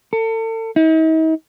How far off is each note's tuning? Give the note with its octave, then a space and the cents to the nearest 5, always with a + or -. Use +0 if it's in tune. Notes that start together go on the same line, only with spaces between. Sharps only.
A4 +35
D#4 +45